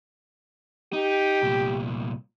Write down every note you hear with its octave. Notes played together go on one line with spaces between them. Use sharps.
D#4 G4
C2 A#2